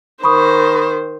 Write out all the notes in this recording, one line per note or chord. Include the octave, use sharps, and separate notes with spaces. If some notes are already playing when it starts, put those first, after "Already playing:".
D#3 C5 B5 C#6 D#6